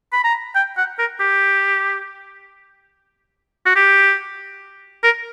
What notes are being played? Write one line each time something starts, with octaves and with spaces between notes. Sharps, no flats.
B5
A#5
G5
F#5
A#4
G4
F#4
G4
A#4